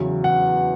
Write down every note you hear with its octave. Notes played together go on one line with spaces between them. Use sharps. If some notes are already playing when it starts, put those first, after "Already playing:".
Already playing: E2 C#3 F#3
F#5